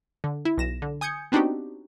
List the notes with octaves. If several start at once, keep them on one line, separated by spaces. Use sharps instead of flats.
D3
E4
B1 A#6 E7
D3
G#5 D#6 G6 G#6 C#7
B3 C4 D4 D#4 F#4 G4